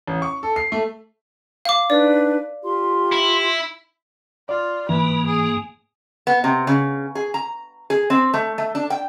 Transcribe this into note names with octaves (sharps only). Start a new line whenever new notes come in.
A1
C#6
A4
C7
A3
F5 D6
D4 D#4 B4 D5
F4 G4 C6
E4
F4 D5
G#2 E3 A#3 B4
G#4
B3
C3
C#3
G#4
A#5
G#4
C4
A3
A3
D4
G5